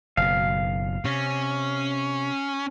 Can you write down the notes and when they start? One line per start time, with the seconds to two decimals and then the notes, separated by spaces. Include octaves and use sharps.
0.17 F#1 B2 F5
1.05 C3 C#4